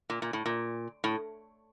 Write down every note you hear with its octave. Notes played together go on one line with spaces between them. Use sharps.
A#2
A#2
A2
A#2
A2